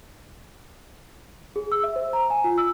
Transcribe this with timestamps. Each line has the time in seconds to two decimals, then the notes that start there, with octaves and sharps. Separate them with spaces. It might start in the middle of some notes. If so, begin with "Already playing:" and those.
1.56 G#4
1.72 E6
1.84 E5
1.96 C5
2.13 A#5
2.30 G#5
2.44 F4
2.58 E6